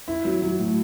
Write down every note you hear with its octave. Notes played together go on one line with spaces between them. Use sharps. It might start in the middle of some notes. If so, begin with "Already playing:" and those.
E4
F#3
F#3
A2